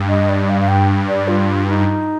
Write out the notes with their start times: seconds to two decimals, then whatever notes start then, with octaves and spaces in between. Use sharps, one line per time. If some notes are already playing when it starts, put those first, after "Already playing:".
Already playing: G2
0.09 D#5
0.29 D5
0.49 F5
0.61 F5
0.68 G5
1.08 D5
1.28 F4
1.68 D#4